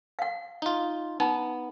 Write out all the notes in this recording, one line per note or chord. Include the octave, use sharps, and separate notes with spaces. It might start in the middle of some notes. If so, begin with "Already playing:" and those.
F5 F#5
D#4 F4
B3 D#4 A#5